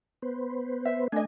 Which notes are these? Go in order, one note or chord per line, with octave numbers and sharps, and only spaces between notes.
B3 B4 C5
E5
A3 D4 D#5 G#5